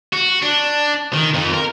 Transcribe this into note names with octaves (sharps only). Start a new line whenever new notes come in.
F#4
D4
D#3
F2
A#4